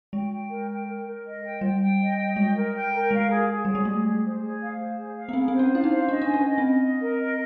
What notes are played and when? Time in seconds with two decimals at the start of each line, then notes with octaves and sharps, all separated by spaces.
0.13 G#3 G5
0.31 G5
0.50 A#4
0.69 G5
0.87 A#4
1.06 A#4
1.25 D#5
1.43 G5
1.61 G3 G5
1.80 G5
1.99 D#5
2.17 G5
2.36 G#3 D#5
2.55 A#4
2.74 G5
2.92 A#4
3.11 G#3 F5
3.29 G#4
3.48 G#4
3.65 G3 G#4
3.75 G#3
3.85 A3 G#4
4.04 G#4
4.23 C5
4.41 G#4
4.60 F5
4.78 C5
4.97 G#4
5.16 F5
5.29 B3
5.33 C4 G#4
5.48 C4
5.53 C5
5.59 C#4
5.71 E4 F5
5.84 D#4
5.89 C5
6.08 D4 D#5
6.22 D4 G#5
6.34 C#4
6.45 D#5
6.58 C4
6.64 D#5
6.83 D#5
7.01 A#4
7.20 D#5